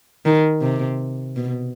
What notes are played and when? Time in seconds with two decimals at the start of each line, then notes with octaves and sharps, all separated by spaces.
0.25 D#3
0.61 C3
1.36 B2